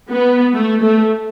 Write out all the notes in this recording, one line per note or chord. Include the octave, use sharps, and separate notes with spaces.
B3
A3
A3